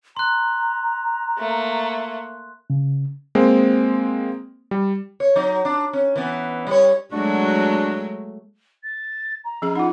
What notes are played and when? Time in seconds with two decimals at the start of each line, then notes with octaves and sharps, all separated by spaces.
0.17 A#5 C6 F#6
1.39 A3 A#3
2.70 C#3
3.35 G#3 A#3 C4
4.71 G3
5.20 C#5
5.36 F#3 D#4
5.65 D4
5.93 C#4
6.16 E3 B3
6.67 G3 C#5
7.13 F#3 G#3 A3 D4 F#4
8.83 A6
9.44 A#5
9.62 F3 C#4 G#4
9.76 D#4 F4 F#5